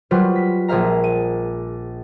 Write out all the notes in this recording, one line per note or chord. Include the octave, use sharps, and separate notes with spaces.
F#3 G3 F4 B4 C5
B6
A#1 G#4 C5 E5 F5 A#5
D#7